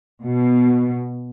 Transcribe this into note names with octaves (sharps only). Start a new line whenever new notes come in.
B2